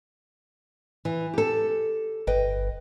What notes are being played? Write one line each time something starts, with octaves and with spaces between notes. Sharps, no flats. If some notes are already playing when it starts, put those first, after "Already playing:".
E3
G4 A4
G1 B4 D#5 G5